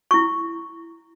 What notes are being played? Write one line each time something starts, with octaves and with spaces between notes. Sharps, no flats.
E4 C#6